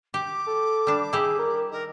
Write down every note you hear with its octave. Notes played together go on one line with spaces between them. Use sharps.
G4 D6
A4
G3 D4
E4 G4 G#4
A#4
D#3 A#4